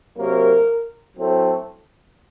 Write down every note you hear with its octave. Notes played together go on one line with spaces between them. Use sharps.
C3 F#3 A#3 A#4
A2 F#3 A3 C4